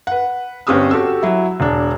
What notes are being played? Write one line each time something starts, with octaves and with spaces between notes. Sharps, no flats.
B4 F#5
G1 C4 C#4 G4 D#6 E6
F#4 G4 A4 E6
F#3 E4
E1 D4